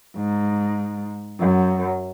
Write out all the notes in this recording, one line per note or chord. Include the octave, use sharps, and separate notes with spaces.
G#2
F#2